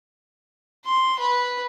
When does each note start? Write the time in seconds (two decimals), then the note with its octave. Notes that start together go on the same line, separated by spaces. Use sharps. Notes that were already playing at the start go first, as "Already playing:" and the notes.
0.85 C6
1.19 B4